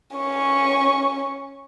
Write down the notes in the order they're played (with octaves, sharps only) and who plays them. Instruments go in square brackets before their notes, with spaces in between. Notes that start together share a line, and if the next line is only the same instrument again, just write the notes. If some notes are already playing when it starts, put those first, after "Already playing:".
[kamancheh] C#4 C#6